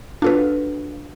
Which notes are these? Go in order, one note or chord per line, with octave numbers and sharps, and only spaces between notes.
D4 F4 F#4 A4 B4 C#5